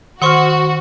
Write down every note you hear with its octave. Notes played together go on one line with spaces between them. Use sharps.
D#3 F#4 C5 F#5 C6 C#6 F6